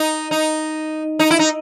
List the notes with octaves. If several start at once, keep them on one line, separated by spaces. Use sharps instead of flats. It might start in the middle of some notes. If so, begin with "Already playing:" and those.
Already playing: D#4
D#4
D#4
E4
D#4